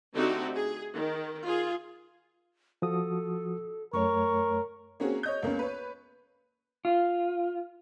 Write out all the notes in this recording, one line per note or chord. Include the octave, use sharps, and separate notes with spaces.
D3 A3 C4 D#4 F#4 G4
G#4
D#3
F4 G#4
F3 F#4 A4 D#6
F#2 A3 A#4 C#5 C#6
A#3 C4 C#4 F#4 G#4
C#5 D#5 G6
C#2 A#3 B3 C#4
B4 C#5
F4